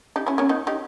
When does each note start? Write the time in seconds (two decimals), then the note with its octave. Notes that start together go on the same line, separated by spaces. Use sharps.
0.16 D#4 G4
0.26 C#4 E4
0.38 A#3 C#4
0.49 B3 D#4
0.67 D#4 G4